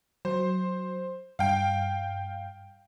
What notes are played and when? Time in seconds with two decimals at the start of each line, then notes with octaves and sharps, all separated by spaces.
0.25 F#3 C5
1.39 G2 F5 G5